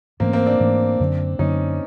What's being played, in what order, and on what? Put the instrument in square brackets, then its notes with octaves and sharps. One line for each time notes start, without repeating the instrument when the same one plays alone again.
[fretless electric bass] G#2 E3 A3 C#4 [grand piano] A#3 C4
[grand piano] A#3 C4
C4 D4
[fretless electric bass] G#2 E3 A3 C#4
F#2 D3 F#3 A#3
[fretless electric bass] F#2 D3 F#3 A#3 [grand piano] C#4 D#4